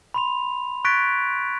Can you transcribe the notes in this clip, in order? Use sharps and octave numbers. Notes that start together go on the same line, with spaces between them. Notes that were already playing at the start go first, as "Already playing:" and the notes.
B5 C6 F7
C#6 F#6 G#6 A6 B6 D7